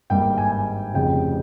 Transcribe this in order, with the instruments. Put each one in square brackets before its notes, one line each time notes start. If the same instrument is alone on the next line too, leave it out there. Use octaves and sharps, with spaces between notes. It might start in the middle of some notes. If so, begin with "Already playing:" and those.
[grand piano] G#1 G2 G3 A#3 G5
G#5
G#5
F1 F2 C#3 G5